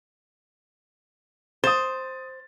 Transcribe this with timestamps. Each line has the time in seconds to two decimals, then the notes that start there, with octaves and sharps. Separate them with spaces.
1.64 C5 D#6 A6